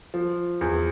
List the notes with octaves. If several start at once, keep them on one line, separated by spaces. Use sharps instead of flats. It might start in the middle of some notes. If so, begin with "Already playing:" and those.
F3
E2